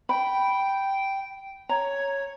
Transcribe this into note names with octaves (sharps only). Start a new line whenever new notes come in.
G5 B5
C#5 A#5